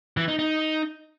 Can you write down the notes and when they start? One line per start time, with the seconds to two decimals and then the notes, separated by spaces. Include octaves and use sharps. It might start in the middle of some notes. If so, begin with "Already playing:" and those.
0.17 E3
0.28 D#4
0.39 D#4